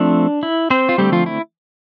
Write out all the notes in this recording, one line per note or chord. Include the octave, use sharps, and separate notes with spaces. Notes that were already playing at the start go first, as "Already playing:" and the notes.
Already playing: F3 A3 C4 D4
E4
C4 C5
F4
D3 G3 A3 C4 G4
F3 F4
E4